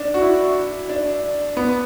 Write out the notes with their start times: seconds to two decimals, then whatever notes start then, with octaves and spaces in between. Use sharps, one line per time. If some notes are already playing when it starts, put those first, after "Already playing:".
Already playing: D4
0.14 F#4
0.21 E4
0.89 D4
1.57 B3